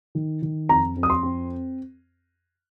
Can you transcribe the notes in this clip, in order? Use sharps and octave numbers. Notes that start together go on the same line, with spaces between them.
D#3
D#3
F2 A#5
F2
D#6
C6
C4